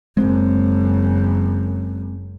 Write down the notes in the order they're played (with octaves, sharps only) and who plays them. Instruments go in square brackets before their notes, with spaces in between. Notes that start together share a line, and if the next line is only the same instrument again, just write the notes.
[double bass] F#1 F#2 [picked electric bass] G#3 C4